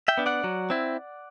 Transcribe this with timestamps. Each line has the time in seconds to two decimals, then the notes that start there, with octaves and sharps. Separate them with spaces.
0.08 E5 G5
0.18 B3 D4
0.26 D5 F#5
0.44 F#3
0.70 C4 E4